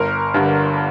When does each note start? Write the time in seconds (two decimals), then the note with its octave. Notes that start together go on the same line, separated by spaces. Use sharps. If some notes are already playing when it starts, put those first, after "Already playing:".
Already playing: G1 A#4
0.34 G2 D3